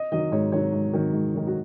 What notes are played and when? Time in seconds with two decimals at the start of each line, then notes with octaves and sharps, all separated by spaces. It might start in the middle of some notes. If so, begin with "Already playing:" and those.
Already playing: D#5
0.12 D#3 F#3 D#5
0.32 G#2 C#5
0.52 D#3 F#3 C#5
0.73 G#2
0.93 D#3 F#3
1.13 G#2
1.34 D#3 F#3
1.47 F#4